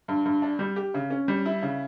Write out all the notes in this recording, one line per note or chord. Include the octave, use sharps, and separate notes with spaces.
G2
G2
D4
G3
G4
C#3
C#4
G3
E4
C#3